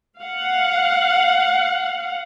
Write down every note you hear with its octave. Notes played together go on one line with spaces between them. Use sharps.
F5 F#5